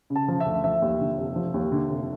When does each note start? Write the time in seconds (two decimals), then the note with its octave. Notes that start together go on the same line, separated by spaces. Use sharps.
0.10 C#3
0.16 A5
0.28 F3
0.40 E5
0.46 D2
0.64 F3 E5
0.82 D#2
1.00 D3
1.18 F1
1.36 F3
1.54 D#2
1.72 D3
1.89 F1